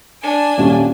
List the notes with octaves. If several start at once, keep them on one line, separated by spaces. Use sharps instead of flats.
D4 G#5
D#1 G3 C#4